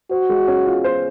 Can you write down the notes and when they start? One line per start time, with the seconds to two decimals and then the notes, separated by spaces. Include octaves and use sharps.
0.11 F#4 C5
0.30 G#3
0.48 C#4
0.66 F4
0.84 C5